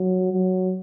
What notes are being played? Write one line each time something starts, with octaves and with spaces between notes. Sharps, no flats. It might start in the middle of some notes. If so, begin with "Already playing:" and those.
Already playing: F#3
F#3